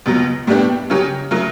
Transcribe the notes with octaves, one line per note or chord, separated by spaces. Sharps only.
C#2 B2 F#3
A2 G3 B3 D4 G4
C#3 F#3 C#4 G4
C#3 F#3 A3